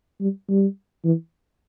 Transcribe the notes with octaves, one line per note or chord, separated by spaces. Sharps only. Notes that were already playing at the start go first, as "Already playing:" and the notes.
G3
G3
E3